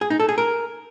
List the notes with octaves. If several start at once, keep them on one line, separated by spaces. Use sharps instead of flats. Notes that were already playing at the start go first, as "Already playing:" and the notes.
G#4
D#4
A4
G#4
A#4